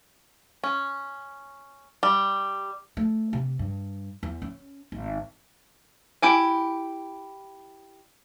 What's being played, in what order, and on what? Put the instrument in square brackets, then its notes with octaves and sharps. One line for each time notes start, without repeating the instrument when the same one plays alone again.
[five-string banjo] C#4
G3
[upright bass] A3
C3
G2
E2
C#4
G#1
[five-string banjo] E4 G4 G#5